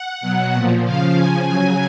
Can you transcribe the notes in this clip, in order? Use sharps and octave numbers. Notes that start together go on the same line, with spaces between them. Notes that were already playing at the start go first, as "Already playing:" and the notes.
Already playing: F#5
B2 F#3
A#2 F3
C#3 F3 F5
C#3 F3 G#5
C#3 F#3